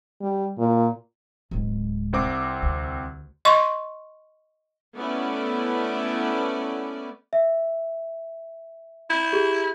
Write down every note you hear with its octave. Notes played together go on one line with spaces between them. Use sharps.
G3
A#2
D1 G#3
C2 C4 D6
D2
D#5 C6 C#6
A3 B3 C#4 E4 B4 D5
E5
E4
G4 G#4